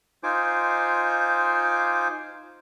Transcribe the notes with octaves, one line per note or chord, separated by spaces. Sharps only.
D#4 F4 C5 G#5 D6